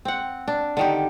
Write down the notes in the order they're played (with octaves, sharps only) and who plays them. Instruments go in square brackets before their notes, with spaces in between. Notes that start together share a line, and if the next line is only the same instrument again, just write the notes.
[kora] C4 F#5
D4
D3 D#3 G4